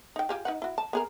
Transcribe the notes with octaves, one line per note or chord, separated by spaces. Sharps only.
D#4 G5
F4 G4 G#4
D#4 B4 F#5
E4 F#4
A5
B3 G#4 A#4